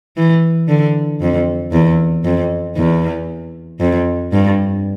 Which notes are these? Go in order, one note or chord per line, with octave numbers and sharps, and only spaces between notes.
E3
D3
F2
E2
F2
E2
F2
G2